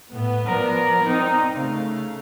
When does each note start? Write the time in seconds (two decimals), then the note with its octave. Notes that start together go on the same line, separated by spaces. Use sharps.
0.11 A2 B3
0.46 F3 A#4 D5
1.04 C4 D#4
1.57 C#3 A3 F5